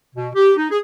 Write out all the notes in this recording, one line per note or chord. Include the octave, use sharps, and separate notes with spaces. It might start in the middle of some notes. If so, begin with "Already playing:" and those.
B2
G4
D#4
G#4